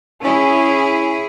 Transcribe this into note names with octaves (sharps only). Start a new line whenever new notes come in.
C#4 E4 G#4